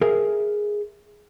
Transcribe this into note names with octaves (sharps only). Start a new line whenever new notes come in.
G#4 A#4 E5 F5